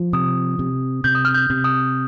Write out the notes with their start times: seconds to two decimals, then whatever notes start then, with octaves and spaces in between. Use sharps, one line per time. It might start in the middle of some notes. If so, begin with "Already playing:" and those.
Already playing: F3
0.13 C3 D#6
0.59 C3
1.04 C3 G6
1.15 D#6
1.25 F6
1.34 G6
1.50 C3
1.64 D#6